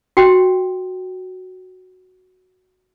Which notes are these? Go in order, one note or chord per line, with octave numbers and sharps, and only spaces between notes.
F#4 G5